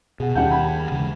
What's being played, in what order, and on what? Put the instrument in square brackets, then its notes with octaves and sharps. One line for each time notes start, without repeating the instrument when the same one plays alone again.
[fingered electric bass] B2 [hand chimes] G#4 F#5
[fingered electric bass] D#2 [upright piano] G3 F#5 G6 [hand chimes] G5 A5
[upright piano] B5 [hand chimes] G#6
[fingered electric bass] C#3 E3 G#3